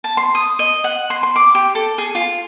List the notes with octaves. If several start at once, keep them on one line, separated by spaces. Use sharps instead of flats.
A5
C6
D#6
D#5
F#5
C6
C6
D6
G4
A4
G#4
F4